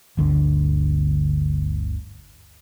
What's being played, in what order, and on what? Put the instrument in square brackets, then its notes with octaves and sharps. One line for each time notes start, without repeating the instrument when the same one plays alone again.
[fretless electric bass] G1 D2 D3